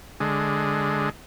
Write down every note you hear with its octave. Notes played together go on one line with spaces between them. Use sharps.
D3 G#3